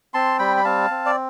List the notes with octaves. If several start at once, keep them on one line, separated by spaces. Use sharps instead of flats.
C4 A5 C6
G3 G5 B5
B5
C4 F5 A5
C4
D5